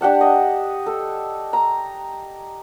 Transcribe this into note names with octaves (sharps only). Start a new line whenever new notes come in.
D4 G4 F#5 A5
D#5
A4
A#5